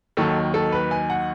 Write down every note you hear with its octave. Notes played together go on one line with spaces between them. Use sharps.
D#2 D#3 F#3 A4
A4
B4
G#5
F#5